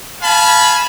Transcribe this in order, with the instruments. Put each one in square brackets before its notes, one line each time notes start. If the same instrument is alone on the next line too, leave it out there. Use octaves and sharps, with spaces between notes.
[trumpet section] F5 G#5 A5 B5